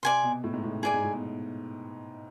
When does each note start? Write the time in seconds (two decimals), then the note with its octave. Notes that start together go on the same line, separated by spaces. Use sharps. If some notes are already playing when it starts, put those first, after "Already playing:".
0.03 C3 D5 G#5 C6
0.23 B2
0.44 A2
0.53 G#2
0.64 A2
0.73 B2
0.83 A2 G#4 D5 G#5
0.94 G#2
1.04 A2
1.13 B2
1.24 B2